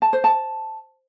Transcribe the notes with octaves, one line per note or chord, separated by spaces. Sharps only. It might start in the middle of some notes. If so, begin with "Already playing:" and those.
A5
C5
A5